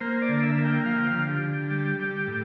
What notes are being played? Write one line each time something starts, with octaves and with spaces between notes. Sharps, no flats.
A#3 C5
D5
D3
E5
A#3
G5
F3 F5
G5
F5
D3
G4
D3
G3
G3
A2